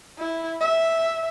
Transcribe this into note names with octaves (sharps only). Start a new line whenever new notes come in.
E4
E5